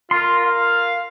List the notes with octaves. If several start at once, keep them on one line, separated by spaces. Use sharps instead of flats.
F4 A#4 C6
F5